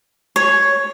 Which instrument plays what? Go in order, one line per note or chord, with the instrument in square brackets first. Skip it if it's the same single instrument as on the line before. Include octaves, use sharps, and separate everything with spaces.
[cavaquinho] C#5